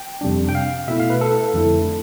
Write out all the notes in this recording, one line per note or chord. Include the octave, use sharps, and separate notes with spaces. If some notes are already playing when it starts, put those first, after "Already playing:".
Already playing: G5
F2 C3 G3 D4
G5
F5
B2 A3 E4 E5
F5
B4
A4
F2 D3 A3 E4